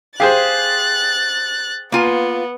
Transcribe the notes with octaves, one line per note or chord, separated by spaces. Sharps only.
G4 G#4 C5 F5 F#6 A6
A#3 B3 F4 G#5